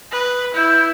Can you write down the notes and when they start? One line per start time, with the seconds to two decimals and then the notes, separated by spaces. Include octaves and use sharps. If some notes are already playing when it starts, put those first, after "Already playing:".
0.12 B4 D#6
0.54 E4 G6